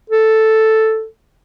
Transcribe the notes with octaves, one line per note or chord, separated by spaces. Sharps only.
A4